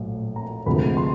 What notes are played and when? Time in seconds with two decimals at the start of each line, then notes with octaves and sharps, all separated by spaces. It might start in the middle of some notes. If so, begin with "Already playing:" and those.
Already playing: A#1 A2 F#3
0.36 A#5
0.66 D2 C3 F3 G#3 B5
0.97 C6